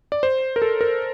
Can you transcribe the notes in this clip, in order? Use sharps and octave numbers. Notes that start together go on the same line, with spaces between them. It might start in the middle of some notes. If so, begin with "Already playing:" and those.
D5
C5
A#4
A4
A#4